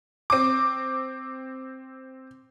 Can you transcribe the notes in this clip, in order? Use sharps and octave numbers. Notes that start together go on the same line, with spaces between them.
C4 D6